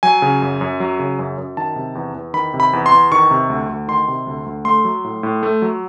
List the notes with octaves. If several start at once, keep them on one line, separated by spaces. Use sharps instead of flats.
F#3 G#5
C#3
F#2
F#2
F#3
C#3
F#2
F#2
D#3 A5
C3
E2
E2
D#3 B5
C3
B5
E2
C6
E2
D#3 C#6
C3
D2
D2
D#3 C6
C3
D2
D2
A3 C6
F#3
A2
A2
A3
F#3